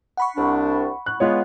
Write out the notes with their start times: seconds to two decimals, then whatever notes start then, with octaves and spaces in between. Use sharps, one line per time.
0.17 F#5 B5 C#6
0.37 C2 D4
1.06 F#6
1.20 G#3 B3 F4 C#5